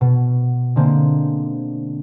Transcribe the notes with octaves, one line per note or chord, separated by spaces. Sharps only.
B2
D3 G#3 A#3 C4